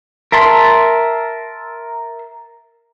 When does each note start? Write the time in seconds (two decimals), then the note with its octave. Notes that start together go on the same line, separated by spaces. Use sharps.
0.32 A#4 E5 A5 C6